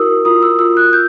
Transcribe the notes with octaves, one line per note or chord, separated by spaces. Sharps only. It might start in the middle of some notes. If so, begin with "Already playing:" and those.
Already playing: E4 F#4 A#4 D#6 E6
F4 D#6
E6
F4 E6
F#6
G6